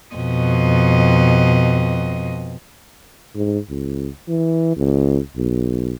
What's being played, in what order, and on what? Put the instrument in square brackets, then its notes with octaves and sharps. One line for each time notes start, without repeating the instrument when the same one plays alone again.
[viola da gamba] F2 B2 D#5
[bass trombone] G#2
C#2
E3
C#2
B1